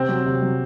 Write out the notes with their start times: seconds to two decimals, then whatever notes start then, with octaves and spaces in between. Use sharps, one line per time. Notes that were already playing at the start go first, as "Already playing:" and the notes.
Already playing: C3 C4
0.09 F#3
0.26 C3
0.42 F#3